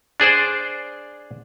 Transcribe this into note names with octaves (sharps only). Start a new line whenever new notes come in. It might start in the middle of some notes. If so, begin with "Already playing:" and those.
D4 G#4 C5 D5